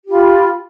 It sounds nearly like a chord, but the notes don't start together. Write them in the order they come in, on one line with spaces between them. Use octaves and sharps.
G4 F4 B5